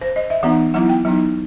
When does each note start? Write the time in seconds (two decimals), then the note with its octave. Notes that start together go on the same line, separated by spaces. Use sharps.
0.01 C5
0.16 D#5
0.30 E5
0.43 E3 B3 D#4 F#5
0.74 F#3 B3 E4 F#5
0.89 G5
1.05 F#3 B3 D#4